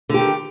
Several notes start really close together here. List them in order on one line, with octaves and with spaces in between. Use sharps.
D3 G4 D#3